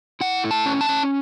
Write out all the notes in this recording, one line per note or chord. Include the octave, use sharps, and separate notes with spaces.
E4 F#5
A3
A5
C#4
A5
C#4